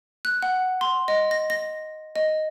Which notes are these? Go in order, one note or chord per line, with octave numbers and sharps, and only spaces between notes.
F#6
F#5
C6
D#5
A#6
A#6
D#5